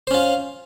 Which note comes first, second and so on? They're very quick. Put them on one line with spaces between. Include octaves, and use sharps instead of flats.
C5 C#4 F4